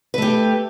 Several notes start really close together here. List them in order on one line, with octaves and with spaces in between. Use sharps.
B4 A3 G4